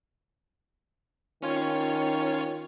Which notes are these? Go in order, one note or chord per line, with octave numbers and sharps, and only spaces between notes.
D#3 C#4 F4 C#5